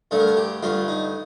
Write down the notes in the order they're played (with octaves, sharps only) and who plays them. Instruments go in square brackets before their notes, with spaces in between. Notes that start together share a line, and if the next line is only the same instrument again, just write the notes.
[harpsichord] G2 D3 A3 A4
A#4
A4
G4
G2 D3 A3 F4
D#4